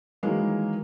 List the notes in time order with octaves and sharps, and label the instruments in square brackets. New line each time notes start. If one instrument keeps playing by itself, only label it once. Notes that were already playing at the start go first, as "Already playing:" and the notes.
[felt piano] D#3 E3 F#3 G#3 A#3